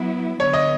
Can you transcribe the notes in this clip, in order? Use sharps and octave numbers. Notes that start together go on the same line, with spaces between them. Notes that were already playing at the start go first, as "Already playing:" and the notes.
Already playing: F#3 B3 E4
D3 F#3 B3 C#5
D#5